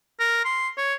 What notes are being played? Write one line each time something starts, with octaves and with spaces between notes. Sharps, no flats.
A#4
C6
C#5